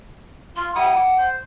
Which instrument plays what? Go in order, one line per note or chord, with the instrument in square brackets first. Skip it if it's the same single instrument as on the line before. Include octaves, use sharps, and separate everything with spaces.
[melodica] F4 [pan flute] C6
[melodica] G3 E4 D#6 [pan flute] F#5
[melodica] D6
C5